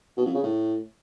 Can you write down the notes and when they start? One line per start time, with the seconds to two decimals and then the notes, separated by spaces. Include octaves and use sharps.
0.17 B2
0.26 F2
0.34 C#3
0.43 A2